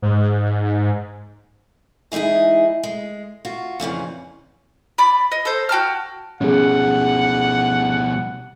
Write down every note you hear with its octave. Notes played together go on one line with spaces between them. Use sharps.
G#2
E3 G#3 D#4 E4 G#4
G#3
F4 F#4
F2 A#2 C#3 E3
D5 B5
D#5
A4 C5
F#4 G5 A5 F6
B2 G3 C#4 G#4 F#5